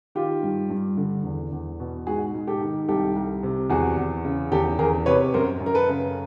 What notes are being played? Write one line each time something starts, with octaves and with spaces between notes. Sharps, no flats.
D#3 F4 G4
G2
G2
D3
E2
E2
B2
G#2 F#4 G#4
G#2
G4 A4
D#3
C2 G4 A4
C2
C3
E2 F#4 G#4
E2
C#3
E2 G4 A4
E2 G#4 A#4
C3 B4 C#5
F#2 A#4 C5
F#2
A#4
A4 B4
C#3